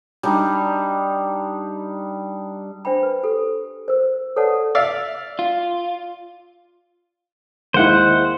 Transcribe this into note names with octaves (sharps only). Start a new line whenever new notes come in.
G3 D4 D#4
D4 C5 E5 G5 B5
B4
G4 A4
A#4 C5
A4 B4 C#5 D5 F#5 A5
D5 E5 F5
F4
D#2 G#3 E4 C5 F#5